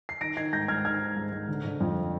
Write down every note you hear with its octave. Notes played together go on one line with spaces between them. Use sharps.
C7
D#3 A#6 D7
D#3 G#6 C7
G#2 G6 A#6
G#2 F6 G#6
D#3 F6 G#6
D#3
G#2
G#2
D3
D3
F2